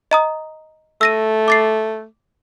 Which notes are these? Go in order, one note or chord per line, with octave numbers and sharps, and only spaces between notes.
D#5 A#5 D#6
A3 E6 A#6 D#7
D6 A6 C7